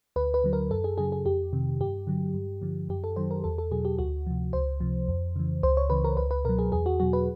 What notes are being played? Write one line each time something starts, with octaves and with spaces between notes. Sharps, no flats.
D2 B4
B4
D3 F#3
A#4
F#2 A4
G#4
C#3 F#3 G#4
G#4
F2 G4
C3 D#3
G2 G4
D3 F#3
G2
D3 F3
F#2 G4
A4
D#3 F#3 C5
A#4
E2 A4
A4
B2 F#3 G#4
G4
D2 F#4
C3 F3
C#2 C5
C3 F3
F2
C#3 E3
C#2 C5
C#5
C#3 E3 B4
A#4
C#2 B4
B4
B2 F#3 A#4
G#4
E2 G#4
F#4
B2 F#3 F#4
B4